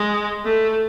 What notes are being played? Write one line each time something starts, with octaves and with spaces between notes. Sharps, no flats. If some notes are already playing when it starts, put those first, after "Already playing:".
Already playing: G#3
A3